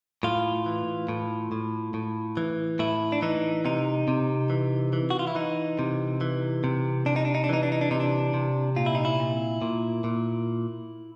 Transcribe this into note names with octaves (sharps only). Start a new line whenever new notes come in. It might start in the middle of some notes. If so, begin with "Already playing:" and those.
A2 F4
E3
A2
A2
A2
E3
A2 E4
D4
E3 D#4
C3 D#4
C3
E3
E3
F#4
F4
E4
E3 D#4
C3
E3
C3
C3 D4
D#4
D4
D#4
D4
E3 D#4
D4
D#4
D4
C3 D#4
D4
C3
A#2 F4
E4
D#4
E4
A#2
A#2
A#2